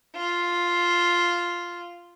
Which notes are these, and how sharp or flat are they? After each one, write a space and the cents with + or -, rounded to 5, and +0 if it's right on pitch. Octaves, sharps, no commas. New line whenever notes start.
F4 +0